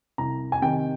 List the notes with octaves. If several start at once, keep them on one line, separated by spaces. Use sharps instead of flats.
C2 A#5
G#5
C3 D#3 G5